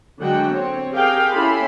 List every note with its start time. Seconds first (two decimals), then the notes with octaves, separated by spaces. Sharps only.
0.20 D3 F#3 G#3 F#4 F#5 G5
0.52 C4 C#5
0.92 G4 G#4 A#4 F5 G5
1.32 C#4 E4 G4 A4 B5 C6